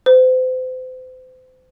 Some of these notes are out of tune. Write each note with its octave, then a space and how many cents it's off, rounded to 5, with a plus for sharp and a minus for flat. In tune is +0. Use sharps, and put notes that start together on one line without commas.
C5 -35